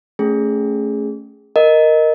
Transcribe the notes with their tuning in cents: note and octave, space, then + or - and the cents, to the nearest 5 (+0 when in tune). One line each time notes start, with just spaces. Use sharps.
A3 +0 C#4 +0 G#4 -5
A#4 +0 D#5 +0